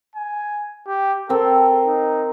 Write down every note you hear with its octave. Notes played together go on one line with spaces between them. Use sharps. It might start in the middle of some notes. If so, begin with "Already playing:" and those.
G#5
G4
C4 A4 A#4
D#4